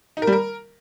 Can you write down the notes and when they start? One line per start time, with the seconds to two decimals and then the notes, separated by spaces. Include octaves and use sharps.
0.17 D#4
0.22 A#4
0.27 G3
0.33 A#4